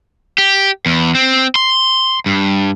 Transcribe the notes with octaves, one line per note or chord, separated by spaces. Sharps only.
G4
E2
C4
C6
G2